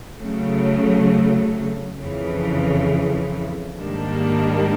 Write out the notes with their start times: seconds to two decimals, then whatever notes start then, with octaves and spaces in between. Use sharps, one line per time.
0.20 C#3 F#3 A3
1.99 F2 C#3 E3
3.78 G#2 D#3 G3 A#3 D4